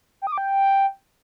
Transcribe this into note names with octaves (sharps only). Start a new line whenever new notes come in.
G5
D#6
D6
G5